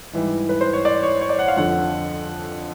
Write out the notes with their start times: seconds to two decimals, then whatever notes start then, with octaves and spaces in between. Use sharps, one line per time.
0.13 G#2 E3 G3
0.49 B4
0.61 C5
0.73 C#5
0.85 D5
1.03 C#5
1.21 C#5
1.29 D5
1.39 F#5
1.48 F5
1.56 F2 D3 F3 F#5